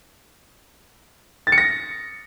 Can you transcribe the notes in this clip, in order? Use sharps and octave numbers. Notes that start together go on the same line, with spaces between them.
A6
C#7
A#6